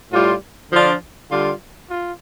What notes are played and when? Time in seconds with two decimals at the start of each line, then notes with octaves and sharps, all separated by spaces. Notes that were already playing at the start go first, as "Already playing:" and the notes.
0.12 A2 G3 F4
0.71 D3 F3 D4 F4
1.30 D3 G3 F4
1.90 F4